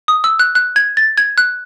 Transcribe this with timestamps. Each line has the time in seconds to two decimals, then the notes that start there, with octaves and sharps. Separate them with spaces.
0.08 D#6
0.24 E6
0.39 F#6
0.55 F#6
0.76 G#6
0.97 A6
1.17 G#6
1.38 F#6